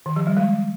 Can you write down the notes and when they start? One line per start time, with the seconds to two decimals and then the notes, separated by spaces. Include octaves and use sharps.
0.06 D#3
0.16 F3
0.27 G3
0.37 G#3